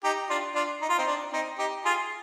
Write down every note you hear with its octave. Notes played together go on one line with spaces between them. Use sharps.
D#4 G4
D4 F4
D4 F4
D#4
F4
C4 D#4
D4
C4 D#4
D#4 G4
F4 G#4